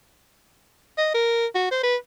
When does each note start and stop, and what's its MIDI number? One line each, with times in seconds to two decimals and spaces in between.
0.98 1.10 75
1.14 1.46 70
1.55 1.68 66
1.71 1.79 72
1.83 1.96 71